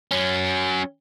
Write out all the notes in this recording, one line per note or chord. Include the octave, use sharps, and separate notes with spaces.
F#3 C#4